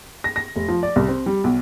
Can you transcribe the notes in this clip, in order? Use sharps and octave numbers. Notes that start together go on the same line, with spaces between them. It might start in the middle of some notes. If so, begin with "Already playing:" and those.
A#6
A#6
F1
F3
D5
C2
C4
G3
B1